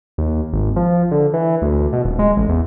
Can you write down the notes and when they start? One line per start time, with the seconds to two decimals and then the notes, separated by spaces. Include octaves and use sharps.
0.18 D#2
0.53 G#1
0.76 F3
1.11 D3
1.34 E3
1.62 D2
1.93 B2
2.05 D#1
2.19 G#3
2.37 A1
2.49 E2